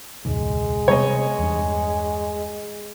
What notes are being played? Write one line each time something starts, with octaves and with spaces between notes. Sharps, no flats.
E1 C#2 G#2 G#3
C3 G3 B3 C#5 D#5
E2 G2